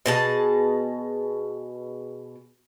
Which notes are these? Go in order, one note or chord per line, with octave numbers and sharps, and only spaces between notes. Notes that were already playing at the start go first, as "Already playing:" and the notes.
B2 G#4 A5